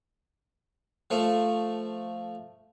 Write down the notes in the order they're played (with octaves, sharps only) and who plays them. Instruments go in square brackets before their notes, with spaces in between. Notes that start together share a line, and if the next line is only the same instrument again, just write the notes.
[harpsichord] F3 A3